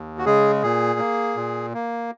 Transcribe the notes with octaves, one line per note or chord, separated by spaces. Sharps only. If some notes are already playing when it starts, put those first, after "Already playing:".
Already playing: D#2
F#4
C#3 G#3 G#4
A#2 G#4
A#3
A#2
A#3